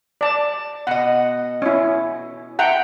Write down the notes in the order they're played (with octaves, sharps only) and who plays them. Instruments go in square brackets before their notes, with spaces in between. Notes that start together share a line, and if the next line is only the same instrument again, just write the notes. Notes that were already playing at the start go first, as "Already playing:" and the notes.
[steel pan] D5 A5
[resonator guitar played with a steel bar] B2 D#5 [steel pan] F#5
[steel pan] C#4 E4
[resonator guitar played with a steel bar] E5 A5 A#5 [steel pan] F#5 G5